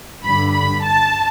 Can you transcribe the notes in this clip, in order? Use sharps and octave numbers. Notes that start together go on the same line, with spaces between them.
G2 D3 B5
B5
A5